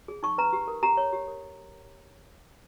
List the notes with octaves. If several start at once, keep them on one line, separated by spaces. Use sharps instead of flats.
G#4
D#4 C#6
B4 A#5
G4
A#4
G4 A#5
C#5
G4
A#4